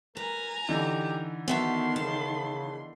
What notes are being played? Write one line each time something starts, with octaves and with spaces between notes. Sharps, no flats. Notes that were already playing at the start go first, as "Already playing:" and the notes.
A#4 B4 G#5 A#5
D3 E3 D#4 G4
D#3 B3 F#4 E5 A5 C6
C#3 A5